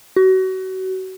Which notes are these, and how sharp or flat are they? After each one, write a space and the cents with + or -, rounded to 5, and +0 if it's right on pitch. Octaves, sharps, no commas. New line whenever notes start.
F#4 +30